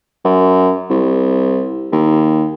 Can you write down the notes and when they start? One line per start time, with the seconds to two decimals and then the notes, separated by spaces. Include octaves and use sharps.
0.25 F#2
0.90 C2
1.92 D#2